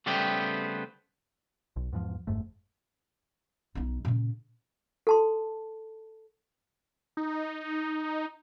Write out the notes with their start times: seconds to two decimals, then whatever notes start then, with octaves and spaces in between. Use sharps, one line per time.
0.06 C#3 G3 A3 B3 C4 G4
1.76 B1
1.92 E2 G#2 D#3 F3
2.27 G1 F2 G#2 A3
3.75 B1 D#4
4.05 A#2 C#3
5.07 A4 A5 C6
7.17 D#4